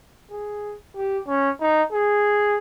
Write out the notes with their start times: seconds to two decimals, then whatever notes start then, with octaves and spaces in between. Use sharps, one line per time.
0.31 G#4
0.96 G4
1.28 C#4
1.61 D#4
1.92 G#4